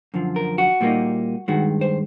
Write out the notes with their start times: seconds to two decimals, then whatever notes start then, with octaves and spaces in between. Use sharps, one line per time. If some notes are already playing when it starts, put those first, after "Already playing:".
0.14 F#2 D3 F3
0.36 A#4
0.58 F#4
0.81 A#2 G3 A#3 D#4
1.48 G2 D#3 G#3 F#4
1.81 C5